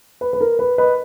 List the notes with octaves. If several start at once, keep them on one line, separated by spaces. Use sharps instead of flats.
B4
B4
A#4
B4
B4 D#5